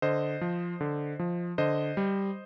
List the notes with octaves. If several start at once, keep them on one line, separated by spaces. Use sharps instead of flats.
D3 C5 D#5
F3
D3
F3
D3 C5 D#5
G3